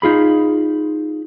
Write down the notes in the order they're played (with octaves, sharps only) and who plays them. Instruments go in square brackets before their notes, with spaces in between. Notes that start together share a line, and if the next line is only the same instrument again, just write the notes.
[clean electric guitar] D#4 F4 G#4 B5